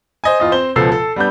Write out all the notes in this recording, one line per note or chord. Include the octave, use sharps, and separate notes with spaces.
C5 D#5 G#5
E2 F4 D#5
C4 C5 G7
C#2 B2 F3 A4 E6 C7
A4
G3 B3 D4 G6